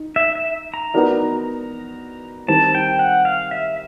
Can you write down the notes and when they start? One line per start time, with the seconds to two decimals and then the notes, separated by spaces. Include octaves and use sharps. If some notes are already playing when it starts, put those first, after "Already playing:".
Already playing: D#4
0.16 E5
0.35 E5
0.74 A#5
0.94 B3 D#4 F#4 A#4 D5
2.48 D#3 G3 C4 A5
2.75 G5
2.99 F#5
3.25 F5
3.51 E5